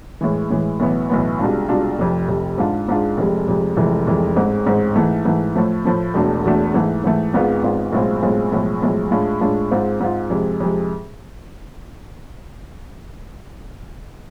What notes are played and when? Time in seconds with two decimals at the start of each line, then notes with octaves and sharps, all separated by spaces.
0.21 A2 E3 G#3
0.50 A2 E3 G#3
0.80 B1 A2 E3 B3
1.10 B1 A2 E3 B3
1.39 C2 B2 G#3 D4 F4
1.69 C2 B2 G#3 D4 F4
1.98 F1 F2 C3
2.28 F1 F2 C3
2.58 G#2 G#3 D4 F4
2.88 G#2 G#3 D4 F4
3.17 F1 F2 C3 G#3
3.48 F1 F2 C3 G#3
3.77 F1 F2 E3 G#3
4.07 F1 F2 E3 G#3
4.36 A1 G#2 G#3 C4
4.66 A1 G#2 G#3 C4
4.96 G#2 E3 A3
5.25 G#2 E3 A3
5.56 A2 F3 A3
5.85 A2 F3 A3
6.14 E1 E2 B2 A3 D4
6.44 E1 E2 B2 A3 D4
6.74 G#2 E3 A3
7.04 G#2 E3 A3
7.33 G#1 G#2 G#3 B3 F4
7.63 G#1 G#2 G#3 B3 F4
7.93 B1 A2 G#3 C4 F4
8.22 B1 A2 G#3 C4 F4
8.52 B1 A2 F3 G#3
8.82 B1 A2 F3 G#3
9.11 A2 G#3 D4 F4
9.41 A2 G#3 D4 F4
9.71 G#2 G#3 C4 F4
10.00 G#2 G#3 C4 F4
10.30 F2 C3 G#3
10.60 F2 C3 G#3